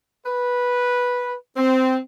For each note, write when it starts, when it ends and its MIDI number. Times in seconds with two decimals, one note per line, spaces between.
0.25 1.34 71
1.57 1.96 60